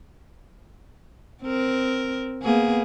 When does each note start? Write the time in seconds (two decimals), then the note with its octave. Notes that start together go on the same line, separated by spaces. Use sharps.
1.43 C4 A#4
2.43 A#3 B3 G#4